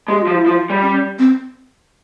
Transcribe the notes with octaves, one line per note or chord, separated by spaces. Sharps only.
G#3 G4
F3 F4
E4
F3 F4
G3
C#4
C4